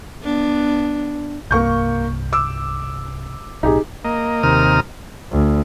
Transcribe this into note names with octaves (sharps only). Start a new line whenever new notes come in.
B3 D4
C2 G2 A#3 C#6 G6
D6 E6
B1 A2 D#4 G4 G#4
A#3 D#5
D#2 C3 A#4 D#6 F6
D2